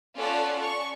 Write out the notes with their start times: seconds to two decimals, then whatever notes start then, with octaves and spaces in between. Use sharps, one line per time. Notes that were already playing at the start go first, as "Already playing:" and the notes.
0.17 C#4 F4 A4 D5 F#5
0.61 C#6